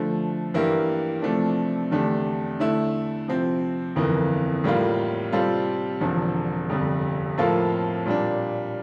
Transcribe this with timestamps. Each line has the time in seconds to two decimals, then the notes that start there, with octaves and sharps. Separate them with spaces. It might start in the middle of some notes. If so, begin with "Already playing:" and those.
Already playing: D3 F3 A3
0.54 G2 E3 A#3 E4 G4
1.22 C3 F3 A3 D4
1.91 E2 D3 A3 D4 G4
2.59 D3 A3 E4
3.28 C3 F3 C4
3.96 G1 F2 E3 A#3
4.64 A2 G3 A#3 F4
5.32 C3 G3 C4 F4 A4
6.01 E1 E2 D3 F3
6.70 G1 F2 C3 G3
7.38 A2 F3 A#3 F4 A4
8.06 A#2 G3 D4